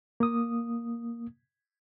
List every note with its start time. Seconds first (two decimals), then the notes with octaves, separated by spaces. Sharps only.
0.20 A#3 D#6